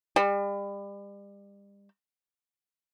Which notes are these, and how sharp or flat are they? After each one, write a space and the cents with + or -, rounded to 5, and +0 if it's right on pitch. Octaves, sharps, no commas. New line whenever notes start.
G3 +35